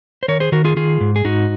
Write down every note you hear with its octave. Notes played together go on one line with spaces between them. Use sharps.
C5
D#3 A#4 C#5
G#4 C5
D#3 F#4 A#4
F4 G#4
D#3 F4 G#4
G#2
G#4
G#2 D#4 F#4